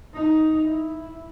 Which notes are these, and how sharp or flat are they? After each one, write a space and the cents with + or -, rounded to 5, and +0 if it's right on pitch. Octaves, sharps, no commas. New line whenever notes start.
D#4 +10
E4 -5